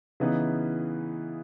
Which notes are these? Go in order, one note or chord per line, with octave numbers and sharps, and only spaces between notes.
C#3 E3 B3 D#4